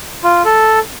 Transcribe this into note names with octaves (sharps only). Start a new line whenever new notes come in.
F4
A4